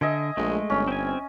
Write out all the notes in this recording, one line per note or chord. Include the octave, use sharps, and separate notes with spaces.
D3 D#5 E5 G#5
A#1 G#3 A3
G1 C#4
C4 G#5